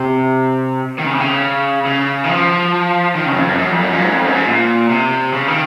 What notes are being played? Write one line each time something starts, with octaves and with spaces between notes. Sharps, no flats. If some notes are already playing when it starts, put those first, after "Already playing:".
Already playing: C3
D#3
C#3
C3
C#3
C#3
D#3
F3
D#3
C#3
F#2
F2
F#2
F#2
F2
F#2
A#2
G#2
F2
F#2
G#2
A#2
C3
C#3
D#3